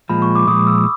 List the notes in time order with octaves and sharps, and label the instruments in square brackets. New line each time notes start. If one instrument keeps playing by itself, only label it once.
[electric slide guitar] A#2 F3 G#3 [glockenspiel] B5
[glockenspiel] C#6
D6
[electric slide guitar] A#2 F3 G#3 [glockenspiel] D#6
[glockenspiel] E6